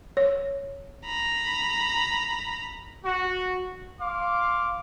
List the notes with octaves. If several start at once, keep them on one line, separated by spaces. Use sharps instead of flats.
C#5
A#5 B5
F#4
F5 C6 D6